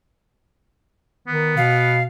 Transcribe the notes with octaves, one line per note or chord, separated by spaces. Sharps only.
D#3 B3
B2 F5